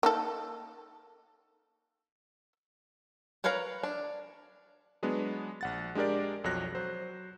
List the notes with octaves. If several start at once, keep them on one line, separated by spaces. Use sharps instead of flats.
A#3 D#4 A4
A#4 B4 C#5 F5 A#5
D4
F#3 G#3 B3 D4
A#1 F#5 A6
G#3 D4 G4 A#4 D5
B1 F2 F#3 C#5 F#6 A#6
F#3 C5